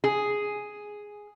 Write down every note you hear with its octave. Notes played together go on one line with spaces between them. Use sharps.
G#4